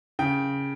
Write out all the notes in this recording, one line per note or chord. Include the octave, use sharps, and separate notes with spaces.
C#3 G5